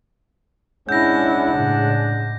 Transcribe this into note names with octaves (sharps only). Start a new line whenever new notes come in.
G#3 C#4 D4 E4 F#5 G6 A#6
A2 C#3